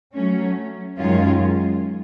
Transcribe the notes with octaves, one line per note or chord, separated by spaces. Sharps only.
F#3 A3 C#4
F#2 D#3 G#3 C#4 F4